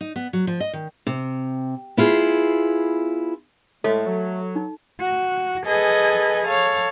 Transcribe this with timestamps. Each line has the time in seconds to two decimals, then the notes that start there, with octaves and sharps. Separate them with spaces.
0.01 D#4
0.16 B3
0.33 F#3
0.47 F3
0.60 D#5
0.73 D#3
1.07 C3
1.97 B3 E4 F4 G#4
3.84 A2 G#3 A3 A4
4.06 F#3
4.56 D#4
5.01 F#4
5.67 G#4 A4 B4 D#5 G#5
6.45 A4 C#5 F5